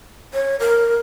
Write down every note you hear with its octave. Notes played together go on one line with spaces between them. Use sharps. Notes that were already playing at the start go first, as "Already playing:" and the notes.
C#5
A#4